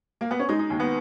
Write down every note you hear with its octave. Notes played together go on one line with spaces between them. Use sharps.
A#3
B3
C#4
G#3 D#4
D#4
D#2
B3